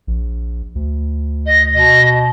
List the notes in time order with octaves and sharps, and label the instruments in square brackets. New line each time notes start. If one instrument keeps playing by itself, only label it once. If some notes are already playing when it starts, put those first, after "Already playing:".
[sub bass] A#1
D2
[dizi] D#5
[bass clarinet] B2 [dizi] D#5